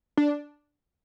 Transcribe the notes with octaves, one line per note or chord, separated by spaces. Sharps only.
D4